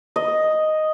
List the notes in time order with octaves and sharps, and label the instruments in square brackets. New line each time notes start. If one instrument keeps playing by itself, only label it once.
[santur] D#5